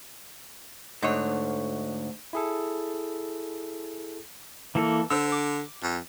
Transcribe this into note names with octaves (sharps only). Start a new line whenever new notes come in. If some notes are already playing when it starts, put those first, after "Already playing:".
D2 G#2 C#5
E4 G#4 A4
E3 A#3 A4
D3 C5 E6
D6
F2